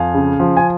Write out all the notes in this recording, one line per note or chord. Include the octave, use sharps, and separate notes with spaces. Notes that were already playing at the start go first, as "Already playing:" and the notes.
Already playing: F2 F5 G#5
C#3
F3
G#5